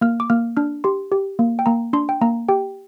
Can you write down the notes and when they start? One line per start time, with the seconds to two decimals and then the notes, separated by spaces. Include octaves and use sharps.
0.01 A#3 F6
0.20 D6
0.30 A#3 F6
0.57 D4 F6
0.84 G4 C6
1.12 G4
1.39 A#3
1.59 G5
1.66 A#3 A#5
1.93 D4 C6
2.09 G5
2.21 A#3 A#5
2.49 G4 G5